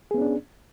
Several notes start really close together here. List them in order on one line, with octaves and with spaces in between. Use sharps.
G#4 B3 C#4 D4